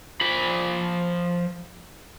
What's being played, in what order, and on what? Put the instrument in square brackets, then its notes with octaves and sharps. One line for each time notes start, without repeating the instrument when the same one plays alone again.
[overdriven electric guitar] F3 B5